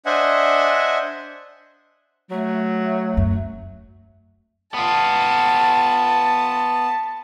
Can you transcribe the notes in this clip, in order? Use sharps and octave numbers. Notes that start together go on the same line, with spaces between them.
D4 C5 D#5 E5 F#5 G#5
F#3 A3
F#2
B3 F4 A5